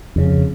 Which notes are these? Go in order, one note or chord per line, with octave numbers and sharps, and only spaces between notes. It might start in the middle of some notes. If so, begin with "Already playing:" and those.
F2 C#3